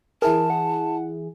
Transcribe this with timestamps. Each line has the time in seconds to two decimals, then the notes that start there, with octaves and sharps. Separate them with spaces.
0.22 E3 E4 G#4 A#4 A5
0.50 F#5